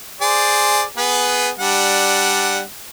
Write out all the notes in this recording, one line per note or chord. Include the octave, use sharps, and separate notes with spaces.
G#4 C5 D5
B3 G#4 B4
G3 D4 F#5